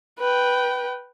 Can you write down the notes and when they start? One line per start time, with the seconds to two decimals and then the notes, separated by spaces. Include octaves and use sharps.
0.20 B4 G5